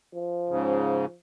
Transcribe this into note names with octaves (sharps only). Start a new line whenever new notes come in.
F3
G#2 C#3